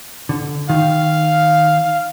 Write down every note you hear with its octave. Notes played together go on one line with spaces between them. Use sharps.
D3
D#3 F5